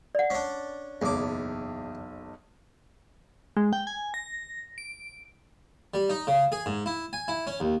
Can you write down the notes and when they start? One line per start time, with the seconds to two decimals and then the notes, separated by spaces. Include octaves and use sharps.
0.15 D5 F#5
0.30 C#4 D4
1.02 F#1 B1 E2 D6
3.57 G#3
3.73 G5
3.87 G#5
4.14 A#6
4.78 D7
5.94 G3
6.09 D#4
6.27 C#3
6.52 G#4
6.66 G#2
6.86 E4
7.13 G#5
7.28 E4
7.47 C#4
7.60 D#2